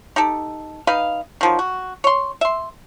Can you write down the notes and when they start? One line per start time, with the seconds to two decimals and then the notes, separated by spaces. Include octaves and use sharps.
0.16 D#4 G4 A4
0.87 D#4 B4 D#5 F5
1.41 D#3 F3 F#3
1.59 F#4
2.04 C#5 C6
2.41 E5 C6